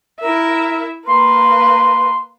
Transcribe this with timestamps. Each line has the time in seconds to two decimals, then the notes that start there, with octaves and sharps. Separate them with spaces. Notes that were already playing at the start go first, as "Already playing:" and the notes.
0.20 E4 A#4 E5
1.06 A#3 B4 C6